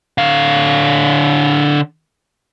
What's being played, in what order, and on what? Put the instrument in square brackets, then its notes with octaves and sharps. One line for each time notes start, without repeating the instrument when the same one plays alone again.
[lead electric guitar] D3 F5